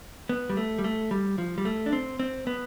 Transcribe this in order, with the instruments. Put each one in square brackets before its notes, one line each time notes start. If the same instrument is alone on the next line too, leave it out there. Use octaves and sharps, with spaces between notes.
[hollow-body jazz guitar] B3
G3
A3
G3
A3
G3
F3
G3
A3
D4
C4
C4
B3